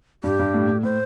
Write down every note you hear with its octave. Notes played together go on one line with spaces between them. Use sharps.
G2 G4
G2
A2
A2
A2 C5